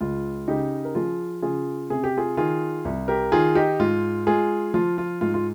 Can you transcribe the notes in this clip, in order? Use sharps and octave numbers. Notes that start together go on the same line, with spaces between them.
C#2 F4
C#3 D#4 G4
A#4
F3 F4 G#4
C#3 F4 G#4
C3 G#4
G4
F4 G#4
D#3 F4 G#4
C2
G4 A#4
D#3 F4 G#4
D#4 G4
G#2 F4
G#3 F4 G#4
F3 F4
F4
G#2 F4
F4